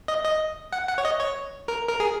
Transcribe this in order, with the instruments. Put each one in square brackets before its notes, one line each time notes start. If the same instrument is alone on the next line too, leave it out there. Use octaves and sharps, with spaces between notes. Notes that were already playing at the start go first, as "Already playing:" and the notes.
[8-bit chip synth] D#5
D#5
F#5
F#5
C#5
D#5
C#5
A#4
A#4
G#4